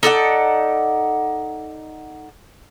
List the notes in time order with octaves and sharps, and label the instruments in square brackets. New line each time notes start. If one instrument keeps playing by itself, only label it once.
[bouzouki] D#4 A4 D5 F#5